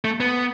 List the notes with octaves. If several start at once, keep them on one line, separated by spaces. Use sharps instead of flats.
A3
B3